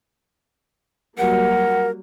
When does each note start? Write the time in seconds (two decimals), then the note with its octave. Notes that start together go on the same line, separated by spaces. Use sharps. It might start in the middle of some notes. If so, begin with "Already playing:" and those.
1.18 F#3 G3 A#3 A#4 F#5